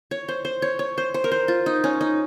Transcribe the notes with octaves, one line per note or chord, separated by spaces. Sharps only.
C#5
C5
C5
C#5
C#5
C5
C5
A#4
C5
F4
D#4
C#4
D#4